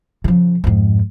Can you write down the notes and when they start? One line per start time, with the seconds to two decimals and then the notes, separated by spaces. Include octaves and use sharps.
0.24 C#3 F3
0.64 F2 G#2